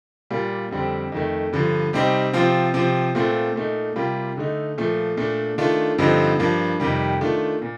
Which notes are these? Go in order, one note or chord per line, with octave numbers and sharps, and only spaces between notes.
A#2 G3 A#3 F4
F2 D3 G3 C4
F2 D#3 A3
G2 D3 F3
C3 G3 C4 D#4
C3 F3 C4 F4
C3 F3 C4
A#2 A3 C4 F4
A#2 A3 D#4
C3 G3 A#3 F4
D3 A3 D#4
A#2 F3 A3
A#2 A3 D4
D#3 A3 D4 F4
G2 D3 F3 C4 D#4
G2 F3 A#3 D4
F2 C3 D#3 G3
D#3 A3 D4 F4
A#2